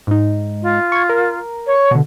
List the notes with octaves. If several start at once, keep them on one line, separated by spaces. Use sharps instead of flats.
G#2 D#4
F4
C#6 G#6
A#4
C#5
B2 D3